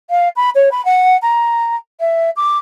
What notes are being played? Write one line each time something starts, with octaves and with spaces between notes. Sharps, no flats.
F5
B5
C#5
B5
F#5
A#5
E5
D6